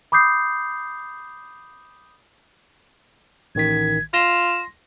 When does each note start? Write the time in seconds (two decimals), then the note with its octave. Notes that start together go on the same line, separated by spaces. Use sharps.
0.12 B5 D6 D#6 G6 C7
3.55 A1 D#3 G#6 B6
4.14 F4 C6 A#6 E7